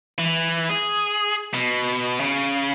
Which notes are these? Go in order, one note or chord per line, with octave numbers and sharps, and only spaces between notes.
E3
G#4
B2
C#3